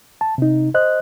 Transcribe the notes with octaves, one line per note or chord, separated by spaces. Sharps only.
A5
C3 D#4
C5 D#5 F#6